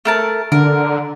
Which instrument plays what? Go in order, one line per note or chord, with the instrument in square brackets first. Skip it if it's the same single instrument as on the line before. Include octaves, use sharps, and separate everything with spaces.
[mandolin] A3 A#4 A5
[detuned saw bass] D3 [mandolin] A#4